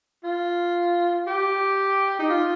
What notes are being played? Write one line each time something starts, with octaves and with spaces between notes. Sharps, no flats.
F4
G4
D#4
F4